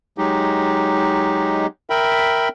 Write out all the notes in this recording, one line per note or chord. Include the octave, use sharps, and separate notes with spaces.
F#3 G#3 D#4 G4
A#4 E5 G5 B5